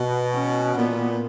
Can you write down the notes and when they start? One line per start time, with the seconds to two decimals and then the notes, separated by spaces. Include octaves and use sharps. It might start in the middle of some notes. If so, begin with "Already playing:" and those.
Already playing: B2
0.34 C#4
0.75 A#2 B3